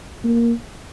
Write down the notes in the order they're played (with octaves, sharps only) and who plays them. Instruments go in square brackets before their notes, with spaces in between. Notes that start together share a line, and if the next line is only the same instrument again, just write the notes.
[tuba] A#3